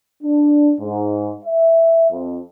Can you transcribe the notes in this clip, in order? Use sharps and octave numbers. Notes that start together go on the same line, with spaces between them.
D4
G#2
E5
F2